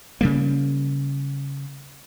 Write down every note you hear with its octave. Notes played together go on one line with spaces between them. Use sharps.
C#3 G3 A#3